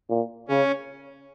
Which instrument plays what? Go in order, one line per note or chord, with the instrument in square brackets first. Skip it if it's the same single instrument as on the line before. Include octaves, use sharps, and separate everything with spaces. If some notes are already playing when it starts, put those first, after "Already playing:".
[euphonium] A#2
[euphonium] C#3 [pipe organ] C#4